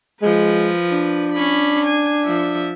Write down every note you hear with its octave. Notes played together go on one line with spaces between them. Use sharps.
F3 G#3 B4
D4
C#4 B5
G#5
F3 E5